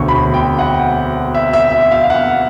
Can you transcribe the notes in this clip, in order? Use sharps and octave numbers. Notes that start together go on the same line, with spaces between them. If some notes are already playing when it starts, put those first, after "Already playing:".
Already playing: E1 D2 D3 C#6
B5
G5
F#5
E5
E5
E5
F5
F5
F#5